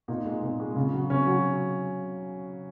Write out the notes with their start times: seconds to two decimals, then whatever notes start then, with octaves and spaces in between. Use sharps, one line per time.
0.08 A#2 D#4
0.25 G#3
0.43 A#2
0.60 G#3
0.76 C#3
0.94 F#3
1.10 C#3 C#4
1.27 F#3